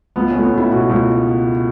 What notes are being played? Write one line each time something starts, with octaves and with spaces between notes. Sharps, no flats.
C#2 B3
C#4
C#2 A3
B3
C#2 E4
B2 F#4
C#2